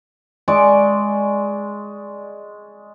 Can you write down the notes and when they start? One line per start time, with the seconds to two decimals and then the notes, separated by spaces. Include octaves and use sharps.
0.48 G#3 D5 C#6 D6